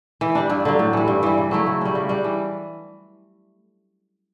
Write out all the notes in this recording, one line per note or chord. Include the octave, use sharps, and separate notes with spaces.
E3
G3 D4
G2
D3 F#3
A2
E3 G3
G2
E3 G3
C#3
F#3 A3 E4
C#3
G3 C#4
C#3
G3 D4
E3